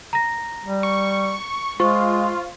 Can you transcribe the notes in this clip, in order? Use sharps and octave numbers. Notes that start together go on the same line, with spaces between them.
A#5 A#6
G3
C#6
G#3 F4 C5 C#6